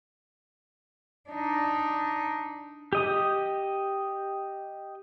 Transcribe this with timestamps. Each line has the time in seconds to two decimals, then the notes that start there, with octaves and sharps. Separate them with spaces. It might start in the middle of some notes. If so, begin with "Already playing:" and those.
1.30 D4 D#4
2.93 G4 D#5 D#6